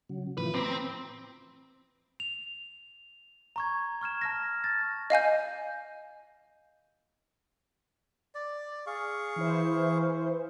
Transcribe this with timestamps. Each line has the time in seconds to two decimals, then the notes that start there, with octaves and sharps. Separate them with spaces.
0.09 C#3 F#3
0.37 A2 E3 F3 B4
0.54 C4 C5 A#5 B5 D6
2.20 F7
3.56 A#5 C#6 G#6
4.01 C#6 F6 G#6 E7
4.21 A5 F6 A#6
4.64 A6
5.10 D#5 F5 G#5 G6
8.35 D5
8.87 G#4 F5 C#6
9.36 E3 E4 C5